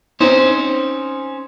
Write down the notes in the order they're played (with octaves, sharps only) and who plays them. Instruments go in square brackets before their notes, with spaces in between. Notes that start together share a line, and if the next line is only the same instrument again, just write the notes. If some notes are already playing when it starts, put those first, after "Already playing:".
[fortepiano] C4 D#4 [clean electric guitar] C#4 C5